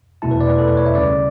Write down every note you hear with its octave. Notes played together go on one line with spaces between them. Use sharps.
E2 B2 A3 E4 A5
B4
D5
B4
A4
B4
C#5
E5
D2 C#3 G3 C#4 D5